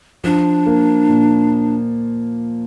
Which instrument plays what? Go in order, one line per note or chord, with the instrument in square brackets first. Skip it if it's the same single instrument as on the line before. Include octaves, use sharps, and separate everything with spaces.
[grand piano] F3 [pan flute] D4
[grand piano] A#3
A#2